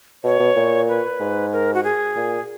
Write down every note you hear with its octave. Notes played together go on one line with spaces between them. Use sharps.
B2 C#5
B2
A#2
B4
G#2
A#4
F#4
G#4
A#2